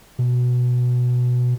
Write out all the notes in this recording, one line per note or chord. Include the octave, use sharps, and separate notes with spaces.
B2